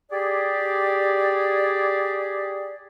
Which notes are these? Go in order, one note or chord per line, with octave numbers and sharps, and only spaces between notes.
G4 G#4 D5